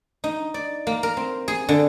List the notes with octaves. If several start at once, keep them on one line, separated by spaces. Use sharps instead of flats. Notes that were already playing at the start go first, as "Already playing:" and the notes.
D#4
D5
A#3
A#4
C4
G#4
D3